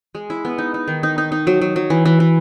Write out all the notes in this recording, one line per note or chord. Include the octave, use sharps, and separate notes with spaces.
G#3
E4
B3
D#4
D#4
D#3
D#4
D#4
D#4
F#3
F#3
F#3
E3
E3
E3